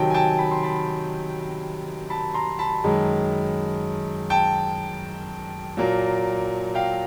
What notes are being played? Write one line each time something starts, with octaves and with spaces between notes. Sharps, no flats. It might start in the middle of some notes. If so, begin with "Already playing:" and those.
Already playing: C3 D#3 F#3 G5 A5
G#5
G5 A5
B5
C6
A5 B5
A5 B5
A#5 C6
A5 B5
F#2 D#3 G#3
G5 A5
A#2 F#3 A#3
F5 G5